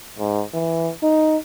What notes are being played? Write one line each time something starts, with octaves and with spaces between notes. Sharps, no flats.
G#2
E3
D#4